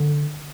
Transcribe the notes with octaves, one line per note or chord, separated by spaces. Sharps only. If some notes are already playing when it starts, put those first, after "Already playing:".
Already playing: D3